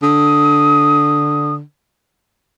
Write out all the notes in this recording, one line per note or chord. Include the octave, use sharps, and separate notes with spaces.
D3 D#6